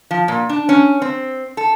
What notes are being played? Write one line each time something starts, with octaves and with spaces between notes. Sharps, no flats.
F3
A#2
D4
C#4
C4
A4